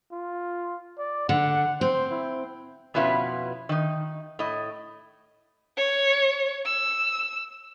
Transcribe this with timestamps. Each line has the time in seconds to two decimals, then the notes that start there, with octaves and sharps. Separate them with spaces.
0.12 F4
0.98 D5
1.29 D3 F#5
1.81 C4 C5
2.11 E4
2.94 F2 B2 C#4 E4 F4 B4
3.69 D#3 D#4
4.39 A2 D#5
5.77 C#5
6.66 E6